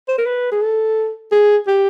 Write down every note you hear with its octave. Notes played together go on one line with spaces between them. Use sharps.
C5
A#4
B4
G#4
A4
G#4
G4